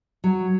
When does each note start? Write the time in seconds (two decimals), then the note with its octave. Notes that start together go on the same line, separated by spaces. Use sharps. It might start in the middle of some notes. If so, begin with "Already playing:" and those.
0.24 F#3